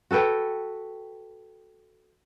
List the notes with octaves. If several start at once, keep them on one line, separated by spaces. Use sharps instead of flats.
F#4 A4 B4 G5